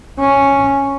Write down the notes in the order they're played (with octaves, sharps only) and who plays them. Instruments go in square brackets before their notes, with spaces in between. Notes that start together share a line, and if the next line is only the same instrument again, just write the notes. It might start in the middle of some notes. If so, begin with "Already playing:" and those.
[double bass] C#4